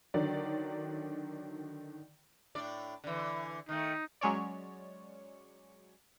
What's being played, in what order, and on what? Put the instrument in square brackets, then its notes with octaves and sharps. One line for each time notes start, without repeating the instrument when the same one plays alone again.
[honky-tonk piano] D3 D#3 F#3 D5
[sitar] A2 D4 D5
D3 E3
[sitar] D#3 A3 [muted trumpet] D#4
[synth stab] F#3 G#3 C#4 C#5 D5